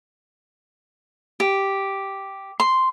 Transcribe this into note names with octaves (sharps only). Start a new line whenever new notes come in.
G4
C6